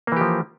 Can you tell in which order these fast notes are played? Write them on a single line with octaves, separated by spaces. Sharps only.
A#3 E3 G4 F3